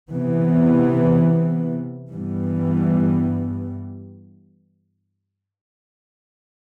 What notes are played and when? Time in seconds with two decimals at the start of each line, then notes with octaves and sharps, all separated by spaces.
0.13 C3 E3 B3
2.13 G2 E3 G3 B3